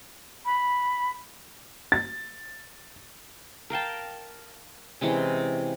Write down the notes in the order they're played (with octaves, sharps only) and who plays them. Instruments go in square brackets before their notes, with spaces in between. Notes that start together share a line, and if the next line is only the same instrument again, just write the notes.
[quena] B5
[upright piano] A6
[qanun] A#4 F5 G5 A5
C3 E3 G#3 C#4